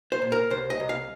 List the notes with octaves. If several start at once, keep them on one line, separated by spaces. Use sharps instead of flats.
C5
A#2
A#4
C2 C5
D#5
C2
F5